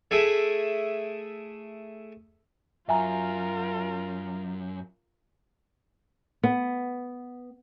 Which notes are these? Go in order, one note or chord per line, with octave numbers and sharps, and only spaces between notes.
A3 E4 G#4
F#2 F4 A#4 E5 G#5 A#5
B3